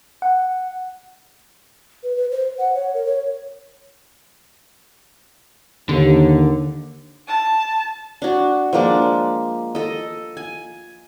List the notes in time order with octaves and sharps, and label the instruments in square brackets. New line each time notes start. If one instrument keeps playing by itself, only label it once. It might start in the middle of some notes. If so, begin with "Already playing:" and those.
[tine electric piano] F#5
[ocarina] B4
B4
C5
F#5
C#5
A#4
C#5
[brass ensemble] D#2 [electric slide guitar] D3
[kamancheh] A5
[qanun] D4 F#4
F3 G#3 A#3 D4
A4 D#5
G#5